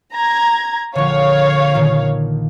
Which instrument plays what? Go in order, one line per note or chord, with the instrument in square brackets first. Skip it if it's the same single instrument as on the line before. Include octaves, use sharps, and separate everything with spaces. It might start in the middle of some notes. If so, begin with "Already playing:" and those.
[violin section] A#5 G#6
[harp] A#1 D3 [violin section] C#5 F5
[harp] A#2 D#3 A#3